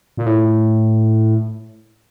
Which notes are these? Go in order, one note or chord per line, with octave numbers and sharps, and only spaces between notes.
A#2
A2